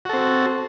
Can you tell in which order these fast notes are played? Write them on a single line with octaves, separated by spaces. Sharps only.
F#4 A4 C4